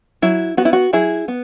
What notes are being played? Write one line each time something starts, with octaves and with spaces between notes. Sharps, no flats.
F#3 E4
B3 F#4
E4
F#4
F#3 E4 G#4
B3